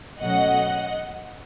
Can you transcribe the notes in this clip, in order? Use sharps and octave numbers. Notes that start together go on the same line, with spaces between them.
B2 F#3 A3 C#4 D#5 F#5